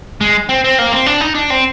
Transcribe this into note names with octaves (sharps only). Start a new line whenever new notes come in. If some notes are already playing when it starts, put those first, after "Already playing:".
G#3
C4
C4
A#3
C4
D4
D#4
D4
C4